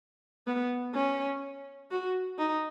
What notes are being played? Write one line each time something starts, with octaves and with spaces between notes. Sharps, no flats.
B3
C#4
F#4
D#4